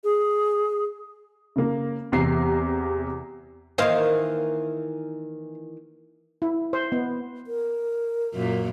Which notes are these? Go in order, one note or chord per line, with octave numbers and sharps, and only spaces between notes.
G#4
C#3 A#3
E2 C3 A#5 C7
D#3 E3 A#3 C5 D#5 F5
E4
C5
B3
A#4
F#2 A#2 A#3